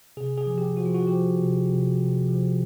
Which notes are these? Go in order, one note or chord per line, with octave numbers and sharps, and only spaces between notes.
C3 G#4
G#4
F3
G4
F3 F#4
F4
F#4
F3 G4
C3
C3
C3
F3